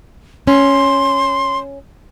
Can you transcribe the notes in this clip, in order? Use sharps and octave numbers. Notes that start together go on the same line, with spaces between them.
C#4 C6